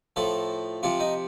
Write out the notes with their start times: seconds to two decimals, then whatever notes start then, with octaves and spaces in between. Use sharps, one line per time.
0.16 A2 F3 A4
0.83 C3 F3 F4
1.00 D#4